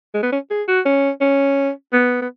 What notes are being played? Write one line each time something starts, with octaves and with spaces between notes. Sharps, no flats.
G#3
B3
C#4
G#4
F#4
C#4
C#4
B3
B3